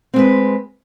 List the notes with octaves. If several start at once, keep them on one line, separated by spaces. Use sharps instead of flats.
G#3 C4 B4